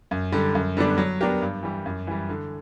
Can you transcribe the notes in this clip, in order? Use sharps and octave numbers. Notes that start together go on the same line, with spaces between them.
F#2
D3 G3
F#2
D3 G3 B3 D4
F#3
B3 D4 G4 A#4
G2
E3 G3
F#2
E3 G3
D3